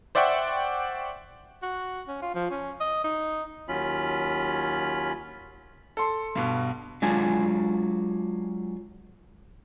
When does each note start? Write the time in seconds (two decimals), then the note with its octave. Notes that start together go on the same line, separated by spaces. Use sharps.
0.15 C5 D5 E5 F#5 G5 C#6
1.62 F#4
2.08 C#4
2.22 F4
2.34 F3
2.51 C#4
2.80 D#5
3.04 D#4
3.68 D#2 F#3 C#4 F4 B5
5.97 A4 C6
6.35 G2 B2
7.02 F#3 G#3 D4 F4 G#5